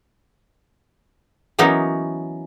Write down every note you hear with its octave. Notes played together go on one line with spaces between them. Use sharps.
E3 F#3 A#3 B3 C#4 D#4